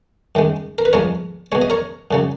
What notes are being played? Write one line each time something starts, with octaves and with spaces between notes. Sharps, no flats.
F#2 D#3 G#3
A#4
B4
F2 F3 G#3 A#4 C#5
B2 G#3 C#5
D#5
A#4 C#5
F#2 C#3 F#3